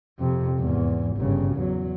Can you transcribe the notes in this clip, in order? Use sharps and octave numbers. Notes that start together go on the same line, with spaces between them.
F2 C3
E2 G#2
G1 C#3
E2 F#3